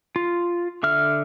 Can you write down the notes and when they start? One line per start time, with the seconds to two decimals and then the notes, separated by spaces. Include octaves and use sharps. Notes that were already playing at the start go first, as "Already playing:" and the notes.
0.16 F4
0.83 D3 E5 F6